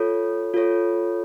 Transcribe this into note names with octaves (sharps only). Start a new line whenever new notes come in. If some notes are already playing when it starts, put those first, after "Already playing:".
Already playing: F4 A4 C#5
F4 A4 C#5